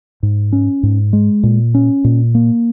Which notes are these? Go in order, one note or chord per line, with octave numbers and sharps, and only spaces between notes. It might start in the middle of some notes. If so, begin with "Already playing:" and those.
G#2
C#4
G#2
G#3
A#2
C#4
A#2
A#3